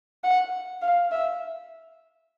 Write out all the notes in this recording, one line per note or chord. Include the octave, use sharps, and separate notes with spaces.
F#5
F5
E5